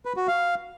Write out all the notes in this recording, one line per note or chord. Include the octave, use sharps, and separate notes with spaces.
B4
F#4
F5